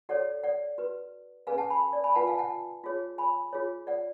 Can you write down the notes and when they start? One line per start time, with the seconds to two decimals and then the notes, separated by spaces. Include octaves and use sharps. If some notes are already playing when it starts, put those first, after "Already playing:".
0.09 F#4 A4 C#5 D5 F#5
0.44 D5 F#5
0.78 F#4 B4
1.47 C#4 G#4 B4 F5 G#5
1.58 F#5 A5
1.70 G#5 B5
1.93 D5
2.04 G#5 B5
2.15 F4 B4 F#5 A5
2.27 F5 G#5
2.38 F#5 A5
2.84 F4 G#4 C#5
3.18 G#5 B5
3.53 F4 G#4 C#5
3.87 D5 F#5